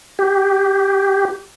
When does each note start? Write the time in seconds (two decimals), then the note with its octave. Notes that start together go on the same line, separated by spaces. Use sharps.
0.19 G4